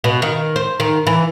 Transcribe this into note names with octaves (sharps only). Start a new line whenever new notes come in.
B2
D#3
C5
D#3
E3